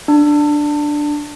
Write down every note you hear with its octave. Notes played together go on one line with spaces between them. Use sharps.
D4